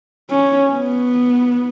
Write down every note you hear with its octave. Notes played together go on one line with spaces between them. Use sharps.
C#4
B3